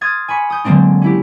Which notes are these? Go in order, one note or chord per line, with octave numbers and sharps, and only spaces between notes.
C6 D#6 F6 G#6 A6
G#5 B5 C#6
D#6 G6
D3 F#3 G#3 A#3 C4 D4
C#4 E4 G4